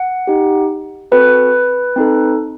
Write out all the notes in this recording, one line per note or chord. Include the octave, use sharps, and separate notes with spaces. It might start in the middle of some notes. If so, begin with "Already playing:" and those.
Already playing: F#5
D#4 G4
C4 F#4 A4 B4
C4 D#4 A4